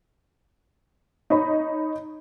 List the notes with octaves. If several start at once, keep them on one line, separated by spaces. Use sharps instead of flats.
D#4 C#5 D#5 B5